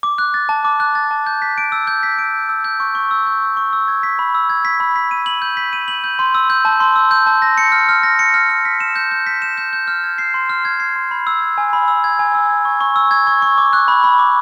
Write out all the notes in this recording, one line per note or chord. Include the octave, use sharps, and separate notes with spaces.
D6
F#6
A6
A5
D6
F#6
A6
A5
G6
B6
D7
E6
G6
B6
D7
E6
E6
G6
C#6
C#6
E6
G6
C#6
C#6
E6
G#6
B6
B5
E6
G#6
B6
B5
B6
D#7
F#7
G6
B6
D#7
F#7
G6
C6
E6
G6
A5
C6
E6
G6
A5
A#6
C#7
F6
F6
A#6
C#7
F6
F6
B6
E7
G6
G6
B6
E7
G6
G6
F6
G#6
C7
C6
F6
G#6
C7
C6
B5
E6
G#6
G#5
B5
E6
G#6
G#5
E6
G#6
C#6
C#6
E6
G#6
C#6
C#6
D6
F#6
B5
B5
D6